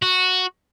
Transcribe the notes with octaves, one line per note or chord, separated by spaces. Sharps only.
F#4